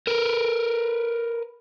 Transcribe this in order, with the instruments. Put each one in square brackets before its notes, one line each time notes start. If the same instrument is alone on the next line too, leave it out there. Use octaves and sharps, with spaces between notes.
[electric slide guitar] A#4 B4